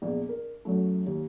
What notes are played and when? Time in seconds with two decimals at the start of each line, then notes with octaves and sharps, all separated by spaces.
0.02 A#1 E2
0.29 A#4
0.65 F#2 F#3 A3
1.06 D#2